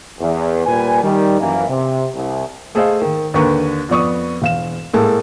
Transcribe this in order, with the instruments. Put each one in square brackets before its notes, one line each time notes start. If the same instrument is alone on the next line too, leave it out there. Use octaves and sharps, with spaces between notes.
[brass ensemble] E2
A#2 G3 B4 G#5
D#3 G3
F#2 E3 A#3
C3
C2
[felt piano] A3 G#4 A4 C5 D#5 F5
D#3
D#2 D3 A#4 B4 A#5 C#6
F2 B3 D5 C#6 D#6
E1 F5 E7
A2 G#3 A#3 A4 A5